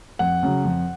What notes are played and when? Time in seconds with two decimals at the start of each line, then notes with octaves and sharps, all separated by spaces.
0.19 F2 F#5
0.43 C#3 F#3
0.64 F2